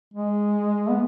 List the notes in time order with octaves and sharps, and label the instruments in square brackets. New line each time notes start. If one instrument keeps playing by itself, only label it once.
[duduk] G#3
B3